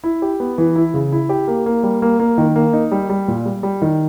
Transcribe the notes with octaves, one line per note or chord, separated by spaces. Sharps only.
E4
G4
B3
E3
E4
C#3
E4
G4
A#3
A#3
G3
A#3
A#3
D#3
A#3
D#4
G3
G3
A#2
G3
G3
D#3